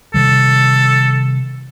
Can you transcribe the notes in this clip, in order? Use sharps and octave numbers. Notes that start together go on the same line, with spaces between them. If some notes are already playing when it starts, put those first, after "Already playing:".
C3 D#3 G3 A4